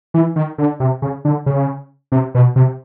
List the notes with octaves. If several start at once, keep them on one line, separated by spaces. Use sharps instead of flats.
E3
D#3
D3
C3
C#3
D3
C#3
C3
B2
C3